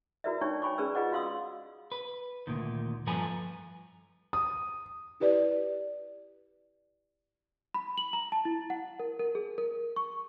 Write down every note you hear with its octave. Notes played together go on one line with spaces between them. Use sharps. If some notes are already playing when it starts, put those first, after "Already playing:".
E4 F#4 A#4 B4 D5 E5
D4 D#4 C#5 D5 G5 C#6
C#5 G5 G#5 B5 C#6 D6
C#4 G#4 B4 D5 E6
F4 G#4 B4 D#5 F#5 D6
F#4 F5 C6 D#6 E6
B4
D2 A#2 D#3
G2 F3 A4 B4 G#5 A#5
D#6
E4 G4 B4 D5
B5
F#7
A#5
A5
E4
F#5
A#4
A#4
G#4
A#4
C#6